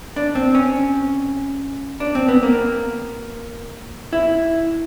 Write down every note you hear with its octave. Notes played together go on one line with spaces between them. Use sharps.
D4
C4
C#4
D4
C4
B3
A#3
E4